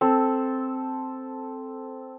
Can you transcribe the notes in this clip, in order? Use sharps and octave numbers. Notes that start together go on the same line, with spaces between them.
C4 A4